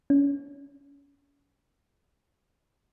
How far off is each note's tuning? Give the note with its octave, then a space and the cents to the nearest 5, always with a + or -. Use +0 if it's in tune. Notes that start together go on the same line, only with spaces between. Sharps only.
C#4 +30